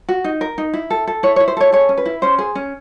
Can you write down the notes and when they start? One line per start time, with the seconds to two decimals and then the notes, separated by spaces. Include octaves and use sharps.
0.09 F#4
0.24 D#4
0.41 A#4
0.58 D#4
0.74 E4
0.90 A4
1.07 A4
1.23 E4 C#5
1.36 C#5
1.40 E4
1.48 C5
1.57 A4 C#5
1.72 G#4 C#5
1.89 C#4
1.98 B4
2.06 E4
2.22 C#4 C5
2.38 G#4 C5
2.55 C#4